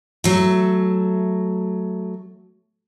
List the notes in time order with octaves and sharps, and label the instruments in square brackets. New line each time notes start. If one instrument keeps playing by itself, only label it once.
[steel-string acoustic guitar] F#3 A3